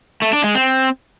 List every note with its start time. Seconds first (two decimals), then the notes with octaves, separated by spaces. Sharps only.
0.22 A3
0.33 D4
0.44 G#3
0.55 C4